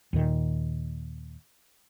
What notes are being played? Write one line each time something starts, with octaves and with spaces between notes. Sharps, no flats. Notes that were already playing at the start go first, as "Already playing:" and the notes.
D#2 A#2 D#3